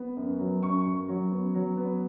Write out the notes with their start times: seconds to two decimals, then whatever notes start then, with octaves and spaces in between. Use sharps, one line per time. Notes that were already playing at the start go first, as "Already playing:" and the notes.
Already playing: B3
0.16 F#2
0.39 F#3
0.62 F#2 C#6
0.85 F#2
1.08 F#3
1.31 B3
1.54 F#3
1.77 B3